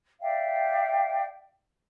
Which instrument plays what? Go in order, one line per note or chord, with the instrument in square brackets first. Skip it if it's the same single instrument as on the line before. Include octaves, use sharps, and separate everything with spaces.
[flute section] D5 E5 F5 G5